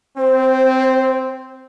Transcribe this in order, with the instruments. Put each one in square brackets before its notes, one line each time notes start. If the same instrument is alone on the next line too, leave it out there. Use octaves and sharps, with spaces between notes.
[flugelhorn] C4 [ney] C5